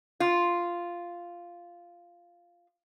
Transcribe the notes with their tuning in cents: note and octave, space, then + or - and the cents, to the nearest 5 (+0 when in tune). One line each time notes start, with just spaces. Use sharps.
F4 -5